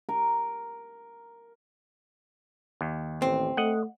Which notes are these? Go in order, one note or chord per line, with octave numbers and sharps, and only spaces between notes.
A#4
D#2
A1 C4
A3 D#5 F#5